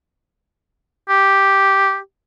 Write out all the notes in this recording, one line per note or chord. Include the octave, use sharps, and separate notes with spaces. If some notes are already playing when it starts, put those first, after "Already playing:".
G4